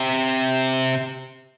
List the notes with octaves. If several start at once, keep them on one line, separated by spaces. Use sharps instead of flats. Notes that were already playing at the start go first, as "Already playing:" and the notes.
Already playing: C3